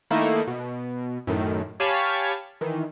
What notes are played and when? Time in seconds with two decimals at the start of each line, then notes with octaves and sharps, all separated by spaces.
0.11 D#3 A3 A#3 D#4 E4
0.47 B2
1.27 F#2 A2 D#3
1.80 G4 C#5 F5 G#5 A5 B5
2.61 D#3 E3